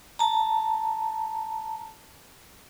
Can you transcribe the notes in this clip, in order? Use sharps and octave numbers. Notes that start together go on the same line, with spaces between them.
A5 A#5